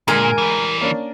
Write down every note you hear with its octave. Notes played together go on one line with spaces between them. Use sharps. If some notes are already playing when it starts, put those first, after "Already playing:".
A#2 D3 G#3 A#4 G#5
E3 G3
A#3 C#4 D4